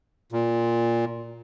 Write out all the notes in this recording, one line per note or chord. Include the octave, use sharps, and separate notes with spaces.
A#2